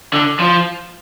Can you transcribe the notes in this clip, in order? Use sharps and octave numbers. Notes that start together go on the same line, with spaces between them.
D3
F3